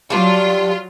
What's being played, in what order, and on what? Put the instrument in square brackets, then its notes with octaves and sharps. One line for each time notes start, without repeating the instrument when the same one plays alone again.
[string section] F#3 F4 [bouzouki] G3 D4